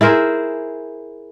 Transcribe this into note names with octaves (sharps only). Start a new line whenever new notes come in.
E4 G#4 A#4 C5